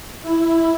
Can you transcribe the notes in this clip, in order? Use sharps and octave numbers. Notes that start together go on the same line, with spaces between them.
E4